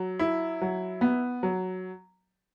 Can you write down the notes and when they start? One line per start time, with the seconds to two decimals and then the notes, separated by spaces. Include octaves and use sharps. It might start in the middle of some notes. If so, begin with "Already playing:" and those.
Already playing: F#3
0.19 E4
0.61 F#3
1.01 B3
1.43 F#3